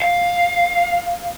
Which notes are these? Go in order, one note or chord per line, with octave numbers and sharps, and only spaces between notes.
F5